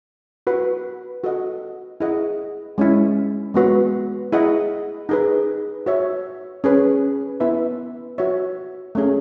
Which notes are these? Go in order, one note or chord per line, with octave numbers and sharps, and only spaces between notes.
F#4 B4 F#5
F#4 A4 D#5 F#5
E4 G#4 D#5 F#5
G#3 C#4 E4
G#3 B3 F#4 B4
E4 G#4 D#5 F#5
D#4 G#4 B4
F#4 C#5 E5
C#4 G#4 B4
B3 E4 B4 E5
F#4 C#5 E5
A3 C#4 G#4